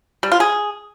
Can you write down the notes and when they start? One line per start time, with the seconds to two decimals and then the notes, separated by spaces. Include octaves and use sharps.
0.23 G3
0.32 F4
0.40 G#4